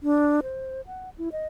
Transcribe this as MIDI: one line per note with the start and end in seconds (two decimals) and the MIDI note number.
0.03 0.41 62
0.43 0.81 72
0.87 1.09 78
1.18 1.29 64
1.32 1.47 75